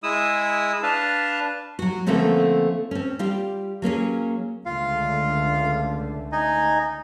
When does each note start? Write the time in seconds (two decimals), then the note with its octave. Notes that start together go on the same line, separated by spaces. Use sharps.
0.03 G#3 E4 D#6 E6
0.83 D4 B4 F5 A5
1.79 F#3 F#4
2.07 D3 F3 A3 A#3 C4 C#4
2.91 C4 C#4
3.19 G3 F4 G4
3.82 F#3 A#3 C#4 G#4
4.66 C#2 D3 A3 F4 F5
6.32 D#4 D#5 G#5